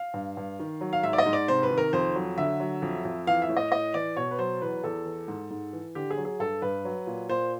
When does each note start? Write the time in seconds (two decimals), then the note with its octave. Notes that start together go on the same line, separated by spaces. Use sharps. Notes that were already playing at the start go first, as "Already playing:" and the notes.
Already playing: F5
0.14 G2
0.37 G2
0.60 D#3
0.81 F#3
0.93 F5
1.03 G#2 E5
1.13 D5
1.18 D#5
1.26 G#2
1.33 D5
1.48 C3 C5
1.63 B4
1.71 D#3
1.78 A#4
1.93 F2 C5
2.15 F#3
2.37 D3 E5
2.60 F#3
2.82 F2
3.05 F2
3.27 E3 F5
3.42 E5
3.49 A2
3.57 D#5
3.72 A2 D#5
3.94 E3 D5
4.16 B2 C#5
4.31 B4
4.38 F#3 C5
4.61 E2 B4
4.84 E2 A4
5.05 E3
5.28 G#2
5.50 G#2
5.73 E3
5.95 D3 G4
6.10 G#4
6.17 F#3
6.25 G#4
6.39 G2 A4
6.62 G2 B4
6.85 F#3
7.07 A#2
7.29 A#2 C5